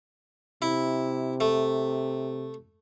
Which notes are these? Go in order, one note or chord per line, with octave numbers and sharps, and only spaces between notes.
C3 E4
A3